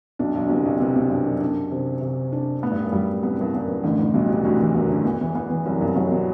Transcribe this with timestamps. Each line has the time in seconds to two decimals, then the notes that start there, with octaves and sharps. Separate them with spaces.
0.19 B1 B2 D4
0.34 B1 B2
0.46 D3
0.50 C2 C3 B3
0.65 B1 B2
0.80 C2 C3 B3
0.95 B1 B2
1.10 G2 D4
1.26 F#2
1.41 D4
1.71 C3
2.01 C3
2.32 D4
2.63 A2 B3
2.71 G2
2.82 F#2
2.92 G2 G3
3.22 C2 C3 B3
3.41 G2
3.53 F#2 B3
3.68 G2
3.84 A1 A2 D3
3.99 A1 A2
4.13 B1 B2 G3
4.29 C2 C3
4.38 E3
4.45 D2 D3 F#4
4.59 E2 E3
4.74 F#2 F#3 B3
4.89 D2 D3
5.05 E2 E3 B3
5.21 E2 E3
5.35 E2 E3 B3
5.50 E2 E3
5.66 C2 C3 F#3
5.75 F#2
5.81 G2
5.95 B1 B2 F#3
6.11 B2